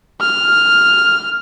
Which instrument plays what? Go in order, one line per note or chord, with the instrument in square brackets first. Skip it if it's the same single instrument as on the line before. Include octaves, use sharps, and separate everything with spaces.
[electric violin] F6